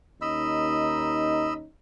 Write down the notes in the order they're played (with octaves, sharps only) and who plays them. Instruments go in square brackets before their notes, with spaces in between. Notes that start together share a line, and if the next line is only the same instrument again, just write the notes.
[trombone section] D#2 C#4 D#4 [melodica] D#5 B5 E6